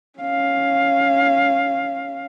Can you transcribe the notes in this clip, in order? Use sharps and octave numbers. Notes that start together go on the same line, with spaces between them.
C#4 F5